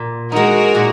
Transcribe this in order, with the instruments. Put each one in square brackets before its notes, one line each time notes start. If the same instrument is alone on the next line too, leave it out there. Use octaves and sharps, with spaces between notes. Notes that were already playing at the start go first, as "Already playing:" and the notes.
Already playing: [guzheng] A#2
[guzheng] G#3 D#4 [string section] F#4 A#4
[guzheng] A#2